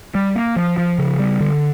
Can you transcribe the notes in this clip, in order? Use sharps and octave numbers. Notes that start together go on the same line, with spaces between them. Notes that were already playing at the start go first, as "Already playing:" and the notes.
G3
A#3
F3
F3
C#3
G3
D3